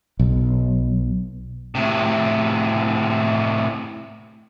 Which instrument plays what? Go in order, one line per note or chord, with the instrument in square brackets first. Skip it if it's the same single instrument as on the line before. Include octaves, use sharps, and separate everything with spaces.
[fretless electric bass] B1
[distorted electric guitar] A2 C3